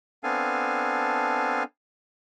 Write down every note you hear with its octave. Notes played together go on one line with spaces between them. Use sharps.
B3 C4 D4 A4 F5 G#5